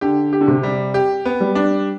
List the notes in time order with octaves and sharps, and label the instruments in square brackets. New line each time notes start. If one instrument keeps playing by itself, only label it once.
[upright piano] D3 [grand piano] G4
[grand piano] G4
[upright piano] D3
C3
[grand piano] G3
G4
B3
[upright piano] G3
[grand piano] D4